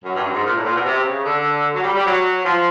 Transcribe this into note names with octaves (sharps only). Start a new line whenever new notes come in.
F#2
G2
F#2
G#2
A#2
A2
A#2
B2
C3
C#3
D3
F#3
G3
G3
F#3
F3